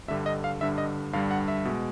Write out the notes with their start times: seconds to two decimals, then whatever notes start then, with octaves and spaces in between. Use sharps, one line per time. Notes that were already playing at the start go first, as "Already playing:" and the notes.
0.08 G2 D3 G3 E5
0.26 D#5
0.44 F5
0.61 G2 D3 G3 E5
0.78 D#5
1.13 G2 D3 G3 F5
1.31 F#5
1.48 E5
1.65 B2 G#3